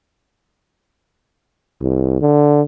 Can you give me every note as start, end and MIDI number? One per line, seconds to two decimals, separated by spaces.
1.81 2.21 36
2.21 2.62 50